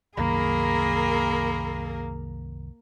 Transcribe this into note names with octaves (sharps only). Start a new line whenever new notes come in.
C2 F#2 D#3 A#3 G#4 A#4 B5